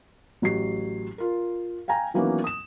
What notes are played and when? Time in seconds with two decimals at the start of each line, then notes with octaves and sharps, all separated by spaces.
0.42 A1 F#3 G4 C7
1.18 F4 A#4
1.88 F5 G5 G#5 A#5
2.14 D#3 E3 F#3 A#3 B3 C#4
2.44 D#6 E7